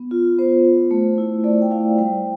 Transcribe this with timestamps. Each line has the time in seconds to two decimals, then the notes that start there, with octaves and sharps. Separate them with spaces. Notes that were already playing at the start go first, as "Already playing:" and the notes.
Already playing: B3
0.11 F4
0.38 B3 C5
0.65 F4
0.91 A3
1.18 E4
1.44 A3 D5
1.62 G5
1.71 E4 F5
1.98 G3 G5